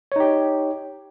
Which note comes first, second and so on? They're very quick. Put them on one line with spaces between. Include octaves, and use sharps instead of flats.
C#5 D#4 G4